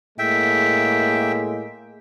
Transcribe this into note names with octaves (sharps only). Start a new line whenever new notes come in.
A2 G#3 A#3 E5 G5